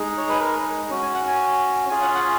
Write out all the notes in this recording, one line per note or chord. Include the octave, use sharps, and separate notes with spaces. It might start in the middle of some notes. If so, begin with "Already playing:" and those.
Already playing: G#3 D#4 G#4
C#5
B4
A#4
C#4 F#4
G#5
F#5
G#5
C#4 F4 G#4 G#5
F#5
F#5